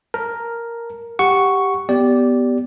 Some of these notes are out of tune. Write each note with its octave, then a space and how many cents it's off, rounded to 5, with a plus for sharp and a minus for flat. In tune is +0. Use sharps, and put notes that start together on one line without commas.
A#4 +0 A5 +0
G4 +0 F#5 +0 C#6 +5
B3 +0 G4 -5 D5 -15